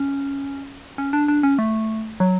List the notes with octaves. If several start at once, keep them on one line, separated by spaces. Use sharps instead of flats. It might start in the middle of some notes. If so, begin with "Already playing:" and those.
Already playing: C#4
C#4
D4
D4
C#4
A3
F#3